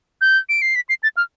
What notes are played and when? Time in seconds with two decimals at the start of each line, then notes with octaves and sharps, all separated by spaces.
0.21 G6
0.49 D7
0.62 C7
0.75 B6
0.89 C7
1.03 A6
1.17 F6